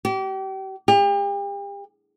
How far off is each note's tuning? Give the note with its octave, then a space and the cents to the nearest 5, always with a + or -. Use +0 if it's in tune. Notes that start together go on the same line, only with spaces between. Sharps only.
G4 -35
G4 +40